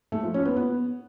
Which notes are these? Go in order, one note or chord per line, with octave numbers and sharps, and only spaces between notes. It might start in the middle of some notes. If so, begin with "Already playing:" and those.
A3
F3
C#4
B3
B3